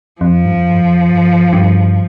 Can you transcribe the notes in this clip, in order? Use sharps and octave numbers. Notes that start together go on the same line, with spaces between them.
F2 F3
G2
F2
G2
F2
G2
G2